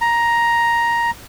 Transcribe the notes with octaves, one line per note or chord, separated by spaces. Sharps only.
A#5